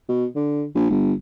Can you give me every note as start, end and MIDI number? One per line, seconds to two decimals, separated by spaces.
0.09 0.25 47
0.36 0.64 50
0.75 0.87 34
0.90 1.13 31